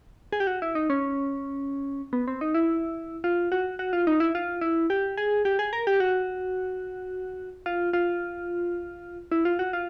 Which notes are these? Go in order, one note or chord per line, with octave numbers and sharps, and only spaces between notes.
G#4
G4
F#4
E4
D#4
C#4
B3
C4
D#4
E4
F4
F#4
F#4
F4
D#4
E4
F4
E4
G4
G#4
G4
G#4
A#4
G4
F#4
F4
F4
E4
F4
F#4
F4